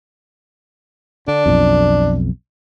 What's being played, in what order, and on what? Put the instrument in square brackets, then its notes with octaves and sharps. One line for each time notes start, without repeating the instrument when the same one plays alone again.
[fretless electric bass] D3 [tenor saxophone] D4
[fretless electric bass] B1 F2